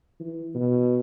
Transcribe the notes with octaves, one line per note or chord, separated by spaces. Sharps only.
E3
B2